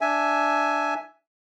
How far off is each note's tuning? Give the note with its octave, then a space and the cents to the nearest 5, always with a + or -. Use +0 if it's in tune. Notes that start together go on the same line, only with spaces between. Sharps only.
D4 +0 E5 +0 G#5 +10